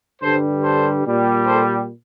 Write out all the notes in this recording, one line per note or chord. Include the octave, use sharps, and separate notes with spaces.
G2 D3 G3 A4 C5
A4 C5
A#2 G3
A4 C5